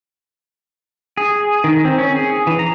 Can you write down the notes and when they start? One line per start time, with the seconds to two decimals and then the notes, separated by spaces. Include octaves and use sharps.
1.17 G#4
1.64 D#3
1.85 C4
1.99 C#4
2.16 G#4
2.47 E3
2.59 A#5